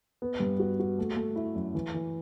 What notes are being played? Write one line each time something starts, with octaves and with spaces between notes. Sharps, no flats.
B3
G2
F#4
F#4
A3
A3
E4
F#2
E3
E3